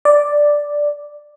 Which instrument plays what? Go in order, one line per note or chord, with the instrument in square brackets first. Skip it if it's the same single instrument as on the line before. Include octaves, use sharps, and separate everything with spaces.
[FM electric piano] D5